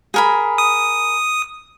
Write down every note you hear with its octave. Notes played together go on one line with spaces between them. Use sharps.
G#4 A#4 B5
D#6